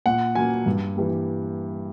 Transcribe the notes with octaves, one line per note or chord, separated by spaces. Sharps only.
A#2 F#5
F#3 A#3 G#5
G2
E3 G3 A#3